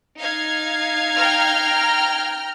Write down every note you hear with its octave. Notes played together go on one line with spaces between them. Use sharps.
D#4 F5 G#6
G5 A#5 F6